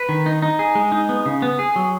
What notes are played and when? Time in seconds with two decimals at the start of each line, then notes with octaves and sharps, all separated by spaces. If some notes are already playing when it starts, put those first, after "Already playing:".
Already playing: B4
0.09 D#3
0.26 D#4
0.42 D#4
0.59 G#4
0.75 G#3
0.92 D#4
1.09 B3
1.26 C#3
1.42 B3
1.59 G#4
1.76 F#3